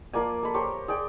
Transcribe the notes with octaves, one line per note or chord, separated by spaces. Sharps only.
F3 A#3 D5 G#5
A4 B5
G4 A#4 C5 C#5
G#4 D5 G5